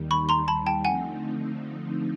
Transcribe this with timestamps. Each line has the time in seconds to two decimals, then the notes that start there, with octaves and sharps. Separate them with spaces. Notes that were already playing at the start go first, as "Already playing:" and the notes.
Already playing: D#2 D#3 G3
0.11 B5 C#6
0.29 A#5 C6
0.48 A5 B5
0.66 G5 A5
0.84 D3 F3 A3 C4 D#4 F#5 G#5